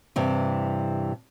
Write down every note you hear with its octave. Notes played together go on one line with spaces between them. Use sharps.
G2 C3 E3